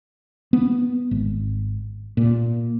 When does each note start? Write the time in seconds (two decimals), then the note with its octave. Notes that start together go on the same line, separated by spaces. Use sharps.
0.53 B3
1.11 G#1
2.17 A#2